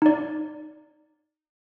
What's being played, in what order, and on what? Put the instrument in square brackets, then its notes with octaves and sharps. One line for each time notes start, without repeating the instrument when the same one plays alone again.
[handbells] D#4 D5